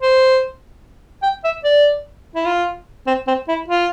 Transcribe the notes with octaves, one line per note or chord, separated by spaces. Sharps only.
C5
G5
E5
D5
E4
F4
C4
C4
E4
F4